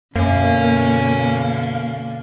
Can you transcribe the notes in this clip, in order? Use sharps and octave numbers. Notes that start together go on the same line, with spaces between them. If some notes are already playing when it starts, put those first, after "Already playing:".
F#2 B2 D3 A#3 C#4